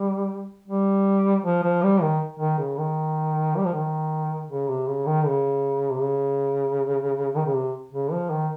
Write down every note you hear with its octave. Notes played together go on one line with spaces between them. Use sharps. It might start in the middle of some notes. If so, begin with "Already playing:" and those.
Already playing: G3
G3
F3
F3
G3
D#3
D#3
C#3
D#3
G3
F3
D#3
C#3
C3
C#3
D#3
C#3
C3
C#3
D#3
C#3
C3
C#3
F3
D#3